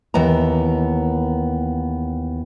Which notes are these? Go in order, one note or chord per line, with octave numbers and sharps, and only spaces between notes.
D#2 E3 B3 A#5